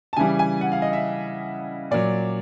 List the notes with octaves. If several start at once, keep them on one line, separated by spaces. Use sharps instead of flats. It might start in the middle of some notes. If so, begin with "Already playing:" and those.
A5
C#3 E3 G3 G#5
G#5
F#5
F5
D#5
E5
A#2 F#3 D5